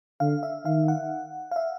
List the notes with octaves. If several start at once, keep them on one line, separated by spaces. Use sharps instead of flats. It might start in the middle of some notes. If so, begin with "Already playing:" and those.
D3 F5
E5
D#3 F5
F#5
F5
E5